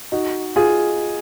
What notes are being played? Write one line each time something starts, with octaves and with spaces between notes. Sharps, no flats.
D#4 F#4
F4 G#4